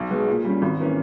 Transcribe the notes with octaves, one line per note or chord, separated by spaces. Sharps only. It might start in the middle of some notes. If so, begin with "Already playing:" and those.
Already playing: B1
B2 G#3
A#2
G3 C#4
G#1
E3 A#3 C#4